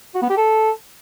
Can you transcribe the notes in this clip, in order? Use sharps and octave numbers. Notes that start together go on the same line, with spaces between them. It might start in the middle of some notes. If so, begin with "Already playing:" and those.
F#4
B3
G4
A4